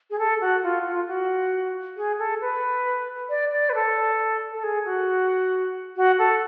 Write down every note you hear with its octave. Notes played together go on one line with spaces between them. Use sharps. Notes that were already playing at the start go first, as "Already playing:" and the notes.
G#4
A4
F#4
F4
F4
F#4
G#4
A4
B4
D5
D5
B4
A4
A4
G#4
F#4
F#4
A4